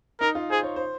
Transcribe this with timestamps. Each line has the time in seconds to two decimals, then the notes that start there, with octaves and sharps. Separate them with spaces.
0.21 D#4 A#4
0.35 F4
0.50 G#4 C5
0.64 C#5
0.76 C5